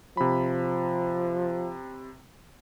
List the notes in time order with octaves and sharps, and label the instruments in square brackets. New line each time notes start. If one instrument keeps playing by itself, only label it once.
[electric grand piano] C3 B5 [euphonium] F3